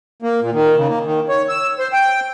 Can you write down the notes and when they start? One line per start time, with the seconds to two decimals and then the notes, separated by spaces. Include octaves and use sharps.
0.22 A#3
0.41 A#2
0.53 D#3
0.76 C#3
0.88 A#3
1.05 D#3
1.29 C#5
1.49 E6
1.79 C5
1.93 G5